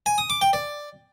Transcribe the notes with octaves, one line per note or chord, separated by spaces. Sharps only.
G#5
D#6
D6
G5
D5